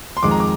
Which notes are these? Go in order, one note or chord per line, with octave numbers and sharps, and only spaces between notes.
C6
F2 D#3 G#3 D6
A#5
D6